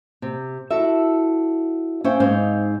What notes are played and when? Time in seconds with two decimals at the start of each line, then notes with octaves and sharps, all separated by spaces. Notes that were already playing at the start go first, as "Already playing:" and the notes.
0.22 C3
0.70 E4 F#4 A4 E5
2.04 C#4 C5 C#5 E5 F5 G5
2.20 G#2 C4 D#4 C5 F5